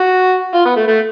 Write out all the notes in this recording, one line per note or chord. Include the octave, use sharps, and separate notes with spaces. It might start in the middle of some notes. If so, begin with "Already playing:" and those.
Already playing: F#4
F4
B3
A3
A3